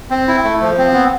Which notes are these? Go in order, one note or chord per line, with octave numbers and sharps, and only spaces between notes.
C4
E4
A3
F3
C4
B3